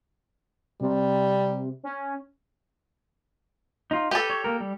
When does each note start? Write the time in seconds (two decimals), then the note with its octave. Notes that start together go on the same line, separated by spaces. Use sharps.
0.81 C3 G3
1.83 C#4
3.91 D#4 F4
4.11 G4 A4 B4
4.30 C#5
4.44 A#3 A#4
4.60 G3